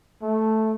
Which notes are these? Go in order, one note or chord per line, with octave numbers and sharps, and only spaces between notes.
A3